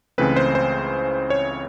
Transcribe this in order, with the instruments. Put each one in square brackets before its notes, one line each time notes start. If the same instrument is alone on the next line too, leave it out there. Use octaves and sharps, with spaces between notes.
[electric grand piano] C#2 C#3 E3 A3 C4 B4
C5
C5
C#5